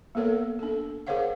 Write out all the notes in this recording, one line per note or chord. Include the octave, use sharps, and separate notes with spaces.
A#3 B3 A4 A#4 C#5
D4 A4
G#4 A#4 C5 C#5 F5 F#5